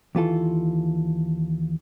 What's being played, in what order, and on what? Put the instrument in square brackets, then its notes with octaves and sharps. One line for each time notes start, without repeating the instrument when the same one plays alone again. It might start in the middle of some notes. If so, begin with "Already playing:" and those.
[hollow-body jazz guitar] D#2 E3 F4 A4